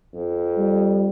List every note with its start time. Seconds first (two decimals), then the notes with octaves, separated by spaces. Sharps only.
0.14 F2
0.57 G3